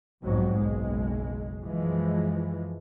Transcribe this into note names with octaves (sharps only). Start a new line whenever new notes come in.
B1 F2 G#2 F#3
F#1 B1 G#3
F#2 E3 F3 G#3